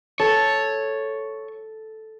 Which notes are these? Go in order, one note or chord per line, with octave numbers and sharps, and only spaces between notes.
A4 C#5